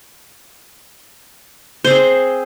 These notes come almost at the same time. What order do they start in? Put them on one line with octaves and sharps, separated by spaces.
C5 C4 G#4